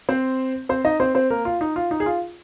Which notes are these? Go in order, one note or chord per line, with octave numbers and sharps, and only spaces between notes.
C4 C5
C4 C5
D#4 D#5
C4 C5
C4 C5
A#3 A#4
F4
D#4
F4
D#4
G#4
F4